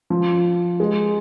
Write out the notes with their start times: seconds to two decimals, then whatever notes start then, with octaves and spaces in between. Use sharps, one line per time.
0.10 F3
0.80 G#3